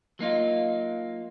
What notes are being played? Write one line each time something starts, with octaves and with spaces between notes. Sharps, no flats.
F#3 A#3 D#4 F4